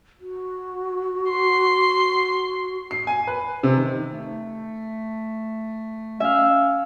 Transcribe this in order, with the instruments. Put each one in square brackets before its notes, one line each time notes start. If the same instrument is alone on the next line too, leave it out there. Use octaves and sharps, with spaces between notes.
[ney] F#4
[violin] C6
[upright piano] C7
G#5
B4
C3
D#3
[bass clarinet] A3
[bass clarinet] C#4 [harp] E5 F5